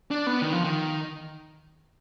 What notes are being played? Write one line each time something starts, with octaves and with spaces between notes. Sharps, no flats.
D4
B3
D#3
F3
D#3